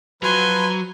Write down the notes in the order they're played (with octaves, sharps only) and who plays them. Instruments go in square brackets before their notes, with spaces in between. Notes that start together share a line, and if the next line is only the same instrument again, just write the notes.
[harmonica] F3 B4 [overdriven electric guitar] F#3 [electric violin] G#5 [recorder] C6